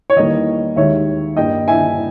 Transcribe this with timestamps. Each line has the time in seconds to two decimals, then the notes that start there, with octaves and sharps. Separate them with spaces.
0.10 C#5
0.16 E2 D#3 G3 A#3 D#5
0.76 D#2 D#3 G#3 C#5 E5
1.37 G2 G3 A#3 D#5 G5
1.68 E5 G#5